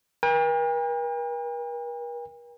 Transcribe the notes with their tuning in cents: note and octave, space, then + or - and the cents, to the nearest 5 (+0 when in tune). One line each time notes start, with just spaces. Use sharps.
A#4 +45 G5 +45